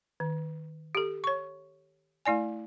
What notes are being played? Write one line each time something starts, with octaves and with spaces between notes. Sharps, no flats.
D#3
G4 A4
C#5 C#6
A3 E4 D5 G#5